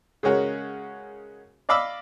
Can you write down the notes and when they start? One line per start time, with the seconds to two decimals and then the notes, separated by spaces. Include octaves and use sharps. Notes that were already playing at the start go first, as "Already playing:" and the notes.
0.23 C#3 G#3 C#4 F#4 A#4
1.69 D5 D#5 F5 B5 D6 E6